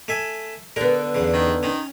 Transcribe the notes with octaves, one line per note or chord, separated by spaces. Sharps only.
A3 E5 G#5
D3 B3 A#4
E2 C#3
D#3
D#3 C#4